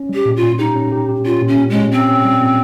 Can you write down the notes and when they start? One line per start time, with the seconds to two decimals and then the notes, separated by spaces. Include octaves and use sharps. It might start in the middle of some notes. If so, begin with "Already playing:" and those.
Already playing: C#4
0.09 G3 G4
0.25 A#2
0.36 F4
0.42 A#2
0.58 D#4 G4
0.76 C#4
0.92 G4
1.09 G4
1.25 C#4 F4
1.42 A#2
1.48 C#4
1.58 A#2
1.70 G#3
1.75 C#4
1.91 C4 C#4
2.08 C#4
2.25 G3
2.41 A#2